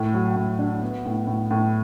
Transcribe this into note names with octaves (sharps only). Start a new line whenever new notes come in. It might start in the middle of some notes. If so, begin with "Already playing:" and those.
Already playing: A2
F#3
A2
D4
B3
A2
A2
A2